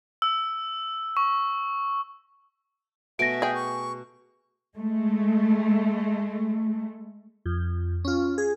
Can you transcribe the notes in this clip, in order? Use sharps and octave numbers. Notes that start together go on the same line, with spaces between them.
E6
C#6
B2 A3 E5 G#5 A#6 D7
G#4 G5
C#6
G#3 A3
F2
C#4 F4
G#4